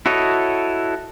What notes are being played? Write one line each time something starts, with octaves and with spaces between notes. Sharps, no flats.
E4 F#4 A4 C#5 D#5